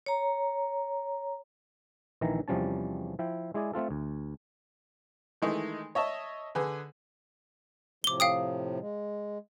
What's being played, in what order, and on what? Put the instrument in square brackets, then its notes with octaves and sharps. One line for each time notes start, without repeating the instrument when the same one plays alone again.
[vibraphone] C#5 A#5
[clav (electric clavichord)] A#1 D#3 E3 E4 A#5
E2 C3 F3 G3 C#4 A5
F3 E4 G5
G#3 E4 G#4 D5 G#5
A3 C4 F4 A4
D2
[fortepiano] D#3 E3 G#3 A3 D#4
C#5 D#5 E5 A5
D3 G#4 B4
[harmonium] A2 C3 F3 [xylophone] D6 G7
[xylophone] F5 G5 D#6
[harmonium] G#3